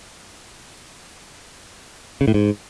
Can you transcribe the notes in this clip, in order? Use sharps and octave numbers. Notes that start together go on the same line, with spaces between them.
C#3
A2
G#2